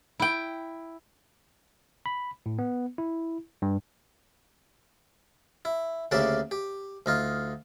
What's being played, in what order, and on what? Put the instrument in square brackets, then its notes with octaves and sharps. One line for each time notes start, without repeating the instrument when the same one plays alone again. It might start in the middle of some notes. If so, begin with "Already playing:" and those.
[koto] E4 G5
[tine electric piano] B5
A2
B3
E4
G2
[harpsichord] E4
D2 C#3 A#3 G4 D5 E5
G4
D2 D#4 F4